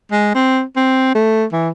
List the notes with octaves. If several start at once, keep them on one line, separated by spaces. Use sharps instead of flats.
G#3
C4
C4
A3
E3